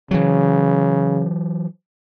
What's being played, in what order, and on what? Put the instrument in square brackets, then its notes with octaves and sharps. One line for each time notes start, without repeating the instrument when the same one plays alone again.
[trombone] C#3 [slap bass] E3 F#3